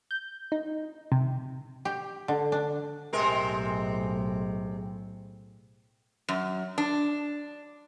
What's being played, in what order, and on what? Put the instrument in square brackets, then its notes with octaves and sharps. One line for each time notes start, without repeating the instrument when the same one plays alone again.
[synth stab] G6
D#4
C3
[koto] G4
D3
D4
[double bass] B1 A2 [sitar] C3 G#3 A#4
[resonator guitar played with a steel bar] F#2
D4